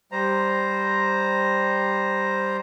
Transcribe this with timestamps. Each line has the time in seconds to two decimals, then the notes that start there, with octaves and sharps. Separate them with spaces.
0.12 G3 C5 A#5